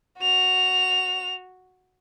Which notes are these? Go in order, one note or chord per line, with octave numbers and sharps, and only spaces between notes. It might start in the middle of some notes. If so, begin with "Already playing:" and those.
F#4 F7